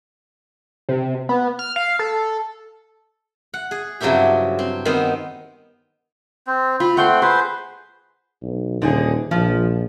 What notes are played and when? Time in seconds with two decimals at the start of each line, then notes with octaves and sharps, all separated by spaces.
0.89 C3
1.29 B3
1.59 F6
1.76 F5
1.99 A4
3.54 F#5
3.71 G#4
4.00 G2 C#3 F#3 C4 E4 G4
4.59 C4
4.85 D#3 B3 C4
6.47 C4
6.80 F4 B5
6.97 A3 C4 F#5 G5 C6
7.22 G#4 B4 C5 C6
8.42 B1
8.82 D#1 D3 D#4 G#4
9.31 A#1 F3